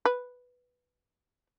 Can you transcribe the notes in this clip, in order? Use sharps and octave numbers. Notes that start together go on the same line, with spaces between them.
B4